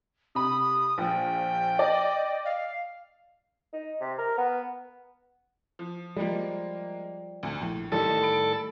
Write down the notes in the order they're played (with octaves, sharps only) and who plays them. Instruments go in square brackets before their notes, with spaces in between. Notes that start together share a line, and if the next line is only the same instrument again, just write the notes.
[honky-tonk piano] C3 B5 [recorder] D#6
[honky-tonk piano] A#1 [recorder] G5
[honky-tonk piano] D5 D#5
[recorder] F5
[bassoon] D#4
C3
A#4
B3
[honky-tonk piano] F3
[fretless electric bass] F3 G3 [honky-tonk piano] G#3 A#3
[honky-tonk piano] D2
[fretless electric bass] A#1 [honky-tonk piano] A2
[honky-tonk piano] A1 [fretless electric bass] A2 D#3 G3 [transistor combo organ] A4
[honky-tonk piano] B5 D7